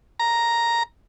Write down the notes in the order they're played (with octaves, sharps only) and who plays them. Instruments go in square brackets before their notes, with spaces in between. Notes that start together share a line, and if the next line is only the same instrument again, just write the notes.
[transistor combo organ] A#5